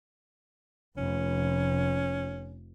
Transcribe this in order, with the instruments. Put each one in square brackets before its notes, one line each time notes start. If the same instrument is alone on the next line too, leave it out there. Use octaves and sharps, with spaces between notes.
[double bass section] F1 [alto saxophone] C#4